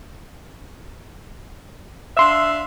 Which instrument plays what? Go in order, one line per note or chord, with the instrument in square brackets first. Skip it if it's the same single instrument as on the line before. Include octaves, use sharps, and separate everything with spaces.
[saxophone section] D4 E5 F5 [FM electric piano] C6 E6